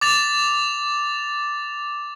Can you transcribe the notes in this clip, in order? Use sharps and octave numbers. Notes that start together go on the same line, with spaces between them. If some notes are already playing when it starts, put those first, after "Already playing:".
D6 A6 F7